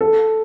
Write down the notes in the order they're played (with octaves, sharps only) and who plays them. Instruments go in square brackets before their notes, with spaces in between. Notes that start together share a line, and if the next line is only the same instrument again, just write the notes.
[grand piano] A4